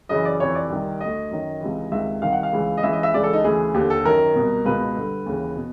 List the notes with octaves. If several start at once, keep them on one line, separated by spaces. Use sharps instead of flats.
F#2 C#3 E3 D#5
D5
F2 C3 E3 C#5
D5
C2 C3 D#3
D2 D3 D#5
F#2 D#3
C#2 C3 E3
C#2 C3 D#3 E5
C2 C3 D#3 F5
F#5
F5
C#2 C#3 E3
D#5
C#2 C#3 E3 E5
D#5
E5
C#2 C#3 E3 D5
A4
D#4
D2 C#3 E3 G#4
D#2 D3 G4
A4
F#2 D#3 A#4
C2 B2
C#2 B2 B4
G2 D3
D#2 C#3 E3
B2